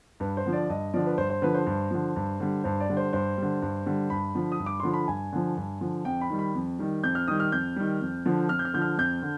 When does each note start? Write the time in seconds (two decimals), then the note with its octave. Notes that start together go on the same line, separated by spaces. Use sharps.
0.20 G2 B4
0.37 C5
0.45 D3 F3
0.53 D5
0.69 G2 D#5
0.94 D3 F3 D5
1.06 B4
1.18 G2 C5
1.30 C5
1.42 D3 F3 B4
1.55 C5
1.67 G2
1.91 D3 F3
2.16 G2
2.40 D3 G3
2.64 G2 C5
2.80 D5
2.89 D3 G3
2.97 C5
3.13 G2 C5
3.38 D3 G3
3.62 G2
3.86 D3 G3
4.10 G2 B5
4.35 D3 F3
4.52 D#6
4.59 G2
4.66 D6
4.80 D3 F3 C6
4.94 B5
5.08 G2 G#5
5.33 D3 F3
5.57 G2
5.81 D3 F3
6.05 F2 G5
6.21 B5
6.30 D#3 G3
6.39 B5
6.55 F2
6.79 D#3 G3
7.03 F2 G6
7.15 F6
7.28 D#3 G3 D#6
7.40 F6
7.52 F2 G6
7.76 D#3 G3
8.01 F2
8.26 D3 F3
8.49 F2 F6
8.59 G6
8.65 F6
8.74 D3 F3 G6
8.82 F6
8.98 F2 G6
9.22 D3